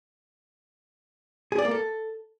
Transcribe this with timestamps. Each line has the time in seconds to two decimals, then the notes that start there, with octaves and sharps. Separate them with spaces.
1.52 G#4
1.58 D5
1.65 A#3
1.71 A4